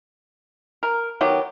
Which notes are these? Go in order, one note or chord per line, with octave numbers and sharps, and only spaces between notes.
A#4
D#3 F#3 B3 G4